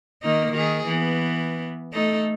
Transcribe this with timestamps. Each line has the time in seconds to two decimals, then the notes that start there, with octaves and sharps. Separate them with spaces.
0.22 D#3 A#3 D#4
0.52 D#3 G#4
0.86 E3 B3
1.93 A3 D#4 A4